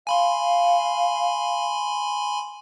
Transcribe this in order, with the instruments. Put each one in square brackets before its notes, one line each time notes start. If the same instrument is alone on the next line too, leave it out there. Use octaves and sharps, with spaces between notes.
[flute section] F5 [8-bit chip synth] G#5 B5 C6